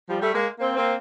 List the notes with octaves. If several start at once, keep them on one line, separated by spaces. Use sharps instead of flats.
F3 G3
G3 A3
G#3 A#3
A#3 C4
A#3 C4